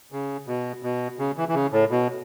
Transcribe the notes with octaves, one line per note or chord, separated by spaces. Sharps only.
C#3
B2
B2
C#3
E3
E3
C#3
A2
B2